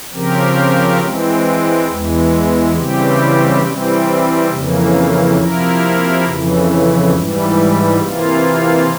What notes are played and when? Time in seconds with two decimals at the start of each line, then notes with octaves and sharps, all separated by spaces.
0.12 C#3 F3 C4 G4 A#4
1.00 E3 G#3 C4
1.87 E2 E3 G#3
2.74 C#3 E3 G3 C4 G4
3.62 C3 E3 G3 C4
4.50 F2 C#3 E3 A#3
5.37 C3 F3 A#3 E4 A#4
6.25 F2 C#3 E3
7.13 G#2 E3 G3
7.99 C3 E3 A#3 F4